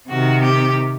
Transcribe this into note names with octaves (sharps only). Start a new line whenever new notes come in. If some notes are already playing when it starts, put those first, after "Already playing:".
C3 D#3 F#4
G4